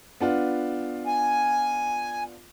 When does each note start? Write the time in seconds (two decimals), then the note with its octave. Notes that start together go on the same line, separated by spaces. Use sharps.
0.20 B3 D4 F4
1.07 G#5